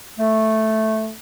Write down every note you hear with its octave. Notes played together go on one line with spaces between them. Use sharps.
A3